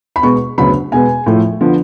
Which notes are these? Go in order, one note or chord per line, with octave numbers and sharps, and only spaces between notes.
B5
B2 G#3 B3 C#6
D2 C#3 F#3 B3 B5
B2 G#3 B3 G#5
A2 F3 A3
D3 F3 B3